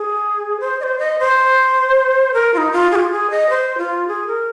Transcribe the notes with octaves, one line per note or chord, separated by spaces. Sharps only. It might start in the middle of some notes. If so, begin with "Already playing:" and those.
Already playing: G#4
C5
D#5
C5
D#5
C5
A#4
F4
D#4
F4
G#4
F4
G#4
D#5
C5
F4
G#4
A#4